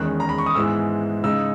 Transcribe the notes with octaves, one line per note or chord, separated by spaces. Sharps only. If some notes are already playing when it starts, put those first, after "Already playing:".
Already playing: E2 D#3 G#3 C#4 F#6
A#5
B5
C#6
D#6
G#2 E3 G#3 B3 E4 E6
C#3 G#3 D#4 E6